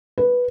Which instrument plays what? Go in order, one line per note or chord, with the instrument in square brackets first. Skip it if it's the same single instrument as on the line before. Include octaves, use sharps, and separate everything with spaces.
[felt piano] B4